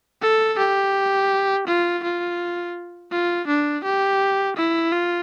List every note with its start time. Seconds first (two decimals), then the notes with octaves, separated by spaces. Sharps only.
0.22 A4
0.58 G4
1.67 F4
2.03 F4
3.12 F4
3.47 D4
3.84 G4
4.56 E4
4.92 F4